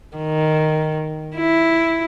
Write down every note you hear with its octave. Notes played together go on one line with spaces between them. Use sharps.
D#3
E4